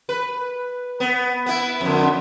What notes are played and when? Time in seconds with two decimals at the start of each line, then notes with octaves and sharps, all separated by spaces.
0.09 B4
1.00 B3
1.46 B3 E4
1.81 F2 D3